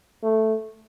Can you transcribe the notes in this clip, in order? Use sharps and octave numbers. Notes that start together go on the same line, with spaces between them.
A3